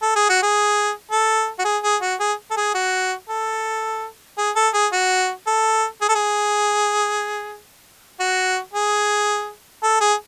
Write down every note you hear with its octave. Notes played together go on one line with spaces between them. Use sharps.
A4
G#4
F#4
G#4
A4
F#4
G#4
G#4
F#4
G#4
A4
G#4
F#4
A4
G#4
A4
G#4
F#4
A4
G#4
A4
G#4
F#4
G#4
A4
G#4